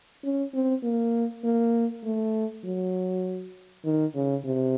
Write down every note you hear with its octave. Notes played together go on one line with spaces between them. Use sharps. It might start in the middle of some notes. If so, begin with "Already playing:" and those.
C#4
C4
A#3
A#3
A3
F#3
D#3
C#3
C3